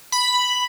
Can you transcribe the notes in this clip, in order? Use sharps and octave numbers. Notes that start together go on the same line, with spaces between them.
B5